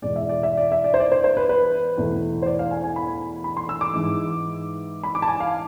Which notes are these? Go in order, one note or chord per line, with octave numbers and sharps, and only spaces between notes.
E2 B2 G#3 D5
E5
D5
E5
D5
E5
D5
C5
D5
C5
C5
B4
B4
E2 B2 A3
C5
D5
F5
G#5
G#5
B5
B5
C6
E6
D6
G#2 E3 G#3
B5
D6
A5
G#5
F5